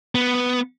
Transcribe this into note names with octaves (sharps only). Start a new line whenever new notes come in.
B3